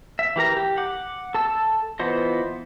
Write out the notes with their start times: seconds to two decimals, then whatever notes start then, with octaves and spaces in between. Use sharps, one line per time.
0.19 E5
0.36 E3 G4 A#4 A#5
0.57 G4
0.77 F#5 D6
1.34 A4 A5 E6
1.99 E3 B3 F4 C5 D#5